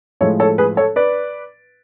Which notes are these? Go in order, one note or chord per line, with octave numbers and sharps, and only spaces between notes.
A2 F3 G#3 A4 C#5
A4 C#5
G#4 B4
A4 C#5
B4 D5